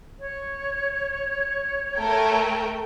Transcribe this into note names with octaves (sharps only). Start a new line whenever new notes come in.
C#5
A3 A#4 G5